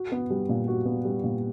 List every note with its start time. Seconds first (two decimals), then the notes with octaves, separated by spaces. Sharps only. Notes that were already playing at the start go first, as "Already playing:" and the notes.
Already playing: F#4
0.12 B3
0.30 G3
0.49 A#2
0.68 F#4
0.86 B3
1.05 G3
1.24 A#2